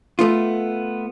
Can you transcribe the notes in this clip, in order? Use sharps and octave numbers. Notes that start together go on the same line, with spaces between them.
A3 B3 F4